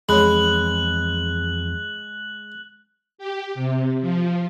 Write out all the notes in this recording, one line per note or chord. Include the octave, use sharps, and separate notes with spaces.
F2 E3 G#3 C#5 B5 F#6 F#7
G4
C3
F3